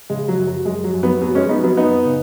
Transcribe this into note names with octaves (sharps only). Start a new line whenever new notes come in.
C#3 G#3
F#3
F#2
F#3
F#2 G#3
F#3
F#2
F#3 B3
F#2 F#3 B3
G#3 C#4
F#3 B3 D#4
F#3 B3
F#2 B3 D#4
C#3